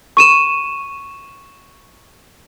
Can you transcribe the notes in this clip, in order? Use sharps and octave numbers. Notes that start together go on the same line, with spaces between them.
C#6 D#7 E7